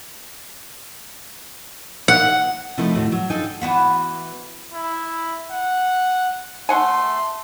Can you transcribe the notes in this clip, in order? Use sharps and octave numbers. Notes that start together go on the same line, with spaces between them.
F#5
C3 F3 A3 D#4 E4 A4
D#2 A2 F3 F#4 A4 C#5
F#3
D4 D#4 F4 A4 G5 G#5
E3 B3 F#4
E4
F#5
A3 F#5 G#5 C6